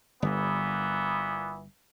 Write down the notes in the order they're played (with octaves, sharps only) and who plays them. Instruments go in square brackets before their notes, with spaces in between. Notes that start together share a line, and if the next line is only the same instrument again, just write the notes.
[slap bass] G1 [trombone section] A#2 E3 B3